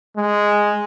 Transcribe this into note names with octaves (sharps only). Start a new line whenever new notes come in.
G#3